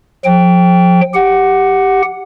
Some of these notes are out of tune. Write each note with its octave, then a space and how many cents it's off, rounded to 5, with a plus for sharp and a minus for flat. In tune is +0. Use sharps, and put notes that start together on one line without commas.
F3 +35 G5 +0
G4 +0 F#5 +0